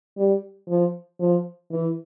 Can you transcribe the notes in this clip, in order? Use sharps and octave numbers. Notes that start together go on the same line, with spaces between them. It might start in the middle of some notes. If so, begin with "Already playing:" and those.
G3
F3
F3
E3